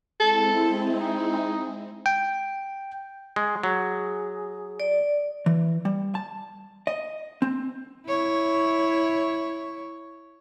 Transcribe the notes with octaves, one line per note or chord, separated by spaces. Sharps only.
G#3 C4 E4 A4
D#4
G5
G#3
F#3 G#4
D5
E3
G3
A5
D#5
C4
E4 C#5